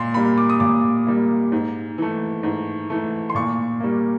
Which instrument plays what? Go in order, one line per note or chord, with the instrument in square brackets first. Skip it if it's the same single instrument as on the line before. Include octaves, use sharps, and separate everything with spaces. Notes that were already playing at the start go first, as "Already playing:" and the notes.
Already playing: [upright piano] A#2 C6
G3 A#3 B5
D6
D#6
A#2 D6
G3 A#3
G#2
E3 A3
G#2
E3 A3
C6
A#2 C#6
G3 A#3